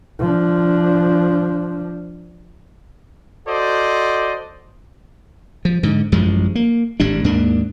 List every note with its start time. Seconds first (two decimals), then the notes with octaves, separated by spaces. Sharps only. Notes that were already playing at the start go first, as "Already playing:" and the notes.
0.19 F3 D4
3.48 F#4 A4 C5 D5 D#5
5.65 F3
5.83 G#2 D3
6.12 A1 F#2 F3 G#3
6.55 A#3
7.00 G#1 A2 G3 D4
7.24 D#2 G#2 A#3 D4